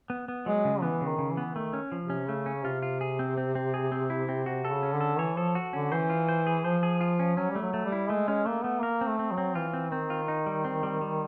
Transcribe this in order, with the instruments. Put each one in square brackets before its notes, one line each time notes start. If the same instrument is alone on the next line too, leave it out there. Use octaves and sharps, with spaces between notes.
[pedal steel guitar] B3
B3
[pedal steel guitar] F#3 [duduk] G#3
[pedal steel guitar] C#3
[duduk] E3 [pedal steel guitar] B3
[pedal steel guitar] C#3
[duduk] D#3
[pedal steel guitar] C#3
[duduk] E3
[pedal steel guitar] B3
[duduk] D#3 [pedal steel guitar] A3
[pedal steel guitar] C#4
F3
[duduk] C3
[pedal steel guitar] C#4
[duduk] C#3 [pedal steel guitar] A3
[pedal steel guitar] C#4
[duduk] C3 [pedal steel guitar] F4
[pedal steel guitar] F4
G#4
C4
C4
C4
G#4
C4
E4
C4
[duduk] C3 [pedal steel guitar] F#4
[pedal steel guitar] A4
[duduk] C#3
[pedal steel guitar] C#4
[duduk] D3
[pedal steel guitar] A4
[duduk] E3 [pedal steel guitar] C#5
[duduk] F3 [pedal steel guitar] A4
[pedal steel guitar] F#4
[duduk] D3 [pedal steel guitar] C#4
[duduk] E3 [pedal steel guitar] C5
[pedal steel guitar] F4
C5
G#4
[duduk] F3 [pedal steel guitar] C5
[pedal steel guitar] G#4
F4
C#4
[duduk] F#3 [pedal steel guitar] C#4
[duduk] G3
[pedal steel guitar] A3
[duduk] F#3
[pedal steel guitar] A3
[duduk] G3
[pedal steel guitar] E4
[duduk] G#3 [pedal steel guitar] A3
[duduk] G#3 [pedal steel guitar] C#4
[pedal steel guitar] A3 [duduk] A#3
[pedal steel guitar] A3 [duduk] B3
[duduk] A#3 [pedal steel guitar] A#4
[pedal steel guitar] C4
[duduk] A3
[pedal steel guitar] C4
[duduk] F#3
[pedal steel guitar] C4
[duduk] E3 [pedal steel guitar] F4
[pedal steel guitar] C4
[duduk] D#3 [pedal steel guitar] C4
[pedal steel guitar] F4
D#4
G3
C4
G3
G3